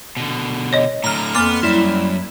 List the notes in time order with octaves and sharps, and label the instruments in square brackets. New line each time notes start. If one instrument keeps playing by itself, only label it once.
[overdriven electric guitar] B2 D3
[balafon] C#5 D#5
[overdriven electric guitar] A2 D3 [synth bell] A#5 F6
[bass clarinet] F2 [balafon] A#3 D6 [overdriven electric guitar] B3 [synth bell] C6 F6
[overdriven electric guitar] F#2 [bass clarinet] G3 [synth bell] E4